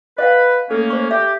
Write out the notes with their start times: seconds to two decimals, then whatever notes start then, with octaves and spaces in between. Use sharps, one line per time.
0.18 B4 D#5 F5 F#5
0.71 A3 A#3 C#4 A4
0.90 C5 C#6
1.11 G4 E5